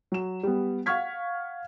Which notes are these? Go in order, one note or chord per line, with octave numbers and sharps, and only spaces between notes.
F#3 E7
G3 B3
F5 F#5 C#6 F6 G#6 B6